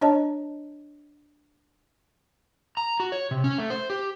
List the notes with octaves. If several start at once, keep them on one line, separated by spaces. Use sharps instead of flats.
D4 C#5 D#5 A5
A#5
F#4
C#5
C3
C#4
A3
C5
G4